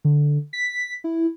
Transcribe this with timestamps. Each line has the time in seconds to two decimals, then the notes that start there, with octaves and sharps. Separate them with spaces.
0.05 D3
0.53 B6
1.04 E4